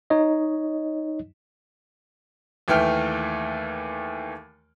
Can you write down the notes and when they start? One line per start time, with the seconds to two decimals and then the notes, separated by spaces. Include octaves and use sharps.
0.10 D#4 C#5 D#5
2.68 D#2 E3 A3 G5 F6